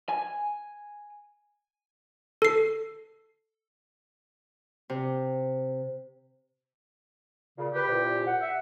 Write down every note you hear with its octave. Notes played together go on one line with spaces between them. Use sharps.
G#5
A4 C7
C3
A#2 C#3
G4 B4
C2 A#2
F#5
E5